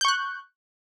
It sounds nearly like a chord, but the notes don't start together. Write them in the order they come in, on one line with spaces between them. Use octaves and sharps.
G6 C#6 F#6